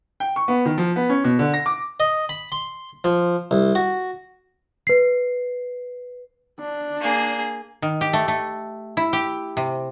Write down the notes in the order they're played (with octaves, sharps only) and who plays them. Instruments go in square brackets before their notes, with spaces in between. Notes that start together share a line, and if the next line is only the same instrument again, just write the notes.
[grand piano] G5
C#6
B3
D#3
F3
B3
C#4
B2
D3
A#6
D6
[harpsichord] D#5
B5
C6
F3
C2
F#4
[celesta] B4 C7
[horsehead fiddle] D4
[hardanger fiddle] A#3 G#4
[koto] D#3
G4
A3
A3
E4
G4
C3